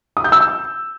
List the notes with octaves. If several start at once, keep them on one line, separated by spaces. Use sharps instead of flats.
D#6
G6
E6